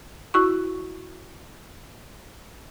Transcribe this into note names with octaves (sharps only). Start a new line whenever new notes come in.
E4 F#4 C#6